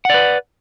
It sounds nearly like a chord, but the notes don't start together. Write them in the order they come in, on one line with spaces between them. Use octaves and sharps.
F#5 D5 B4